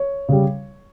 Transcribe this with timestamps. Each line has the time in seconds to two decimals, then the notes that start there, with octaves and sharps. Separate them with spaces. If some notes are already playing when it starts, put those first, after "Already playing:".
Already playing: C#5
0.29 C#3 G3